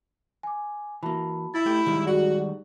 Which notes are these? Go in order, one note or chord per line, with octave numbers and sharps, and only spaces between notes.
G#5 D6
E3 A#3 F#4 A5 B5
E4 A6
A3 G4 G6
D#3 G3 G#3
F#4 G#4 D5